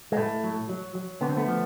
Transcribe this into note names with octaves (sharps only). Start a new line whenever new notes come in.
G#3
A2 A3
F#3
F#3
F#3
D3 B3
C4
A3 B3
F3